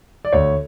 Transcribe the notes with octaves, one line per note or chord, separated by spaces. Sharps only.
D5
D2 C#5